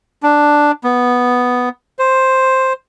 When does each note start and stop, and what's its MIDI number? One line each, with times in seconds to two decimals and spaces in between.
0.23 0.71 62
0.84 1.69 59
1.99 2.73 72